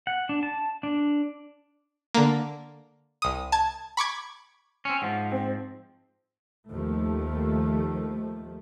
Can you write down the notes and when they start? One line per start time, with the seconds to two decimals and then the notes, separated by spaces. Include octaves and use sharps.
0.07 F#5
0.29 D4
0.43 A5
0.83 D4
2.14 D3 A#3
3.22 C2 D#6
3.52 A5 G#6
3.97 B5 C#6 D6 G#6
4.85 C4 C#4
5.02 G#2 F3 F#5
5.32 C4 C5
6.70 D#2 F3 A3